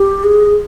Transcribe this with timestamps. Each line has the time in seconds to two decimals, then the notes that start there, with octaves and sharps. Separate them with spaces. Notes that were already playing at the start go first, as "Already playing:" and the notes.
Already playing: G4
0.24 G#4